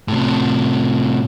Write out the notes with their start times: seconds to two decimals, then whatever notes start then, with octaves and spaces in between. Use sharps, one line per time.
0.08 A2 C3